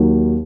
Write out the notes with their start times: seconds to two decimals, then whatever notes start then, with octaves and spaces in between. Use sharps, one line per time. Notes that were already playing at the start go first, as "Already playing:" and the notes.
Already playing: D#2 D#3 F#3